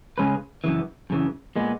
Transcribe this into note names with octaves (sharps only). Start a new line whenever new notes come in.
C#3 G#3 C#4 G#4 B4
F#2 C#3 E3
F#2 C#3 E3
A#2 G#3 B3